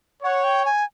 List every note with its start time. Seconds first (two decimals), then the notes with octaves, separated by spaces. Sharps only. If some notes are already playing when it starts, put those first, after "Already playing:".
0.23 C#5 F#5
0.44 G5
0.65 G#5